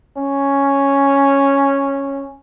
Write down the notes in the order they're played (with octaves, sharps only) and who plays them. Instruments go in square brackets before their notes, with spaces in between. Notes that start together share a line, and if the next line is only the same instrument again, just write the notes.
[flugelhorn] C#4